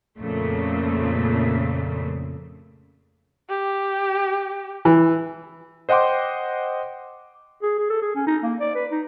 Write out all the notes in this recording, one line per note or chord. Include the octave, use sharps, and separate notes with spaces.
F2 A#2 C#3 A3
G4
E3
C5 D#5 F#5 G5 C6 D6
G#4
G#4
A4
G#4
C#4
D#4
A#3
D5
B4
D#4